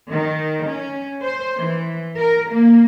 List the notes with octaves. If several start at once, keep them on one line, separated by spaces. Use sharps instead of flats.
D#3
C#4
C5
E3
A#4
A#3